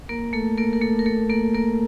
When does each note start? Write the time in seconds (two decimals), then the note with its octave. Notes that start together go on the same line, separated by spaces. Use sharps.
0.09 A#3 A#4
0.33 A3 A4
0.58 A#3 A#4
0.73 A#4
0.82 A3 A4
0.99 A#4
1.06 A3 A4
1.29 A#3 A#4
1.54 A#3 A#4